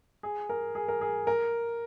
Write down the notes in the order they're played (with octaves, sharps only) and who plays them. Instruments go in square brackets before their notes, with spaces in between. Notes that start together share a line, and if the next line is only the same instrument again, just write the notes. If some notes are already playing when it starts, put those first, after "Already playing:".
[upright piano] G#4
A#4
G#4
A#4
G#4
A#4